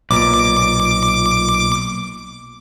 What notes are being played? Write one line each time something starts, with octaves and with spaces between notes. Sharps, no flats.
B1 A#2 D6